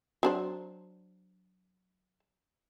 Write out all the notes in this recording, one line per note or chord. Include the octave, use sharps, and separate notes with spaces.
F#3 D4 C5